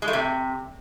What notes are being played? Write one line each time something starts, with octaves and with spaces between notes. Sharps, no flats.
G#3
A3
C3